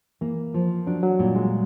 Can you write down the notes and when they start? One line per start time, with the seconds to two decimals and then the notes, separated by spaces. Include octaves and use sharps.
0.21 E3 A#3
0.54 F3
0.87 F#3 D4
1.03 F#3
1.19 A#2 G3
1.35 G#3